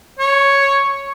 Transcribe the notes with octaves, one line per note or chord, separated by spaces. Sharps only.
C#5